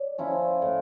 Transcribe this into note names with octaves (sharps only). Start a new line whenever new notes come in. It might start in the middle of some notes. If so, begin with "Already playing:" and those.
Already playing: C#5 D5
F3 C#4 E4
A2